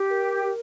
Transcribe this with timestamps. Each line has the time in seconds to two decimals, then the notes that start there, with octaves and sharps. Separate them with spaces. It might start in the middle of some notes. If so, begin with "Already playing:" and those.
Already playing: G4
0.10 A#4